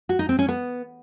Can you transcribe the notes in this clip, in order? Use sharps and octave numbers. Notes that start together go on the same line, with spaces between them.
F#4
D#4
C4
C#4
B3